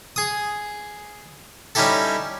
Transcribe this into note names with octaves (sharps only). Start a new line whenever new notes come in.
G#4 D#6
G3 C#4 D#4 E4 G4 A4